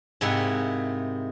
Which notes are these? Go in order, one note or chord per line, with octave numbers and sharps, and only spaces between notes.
G#2 C3 A#3 E4 F#5 G#5